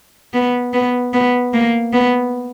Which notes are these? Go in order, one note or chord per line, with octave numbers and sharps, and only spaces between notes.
B3
B3
B3
A#3
B3